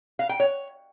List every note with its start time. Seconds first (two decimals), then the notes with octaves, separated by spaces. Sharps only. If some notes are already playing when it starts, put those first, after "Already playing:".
0.19 F5
0.29 G5
0.40 C#5